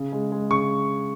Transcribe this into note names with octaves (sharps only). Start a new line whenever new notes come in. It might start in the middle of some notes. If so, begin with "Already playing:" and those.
Already playing: C#3
G#3
G#3
C#3 C#6